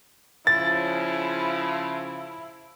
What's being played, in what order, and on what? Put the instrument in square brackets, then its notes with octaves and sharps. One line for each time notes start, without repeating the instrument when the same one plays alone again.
[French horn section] C#3 F3 [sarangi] E4 [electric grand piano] A6